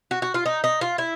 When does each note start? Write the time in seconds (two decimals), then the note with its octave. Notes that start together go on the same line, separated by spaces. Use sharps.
0.11 F#4
0.22 F#4
0.34 F4
0.46 D#4
0.64 D#4
0.81 F4
0.98 E4